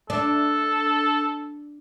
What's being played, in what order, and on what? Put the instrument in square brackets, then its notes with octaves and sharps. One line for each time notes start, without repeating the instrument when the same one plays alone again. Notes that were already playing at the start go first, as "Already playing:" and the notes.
[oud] D4 [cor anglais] A4